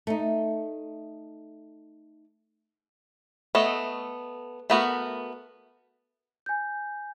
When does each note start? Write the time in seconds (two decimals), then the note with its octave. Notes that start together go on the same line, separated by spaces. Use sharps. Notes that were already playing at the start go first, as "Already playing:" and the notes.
0.07 A3 D#4
3.55 A3 B3 A4 D#5
4.70 A3 B3 F#4 A#4
6.46 G#5 G6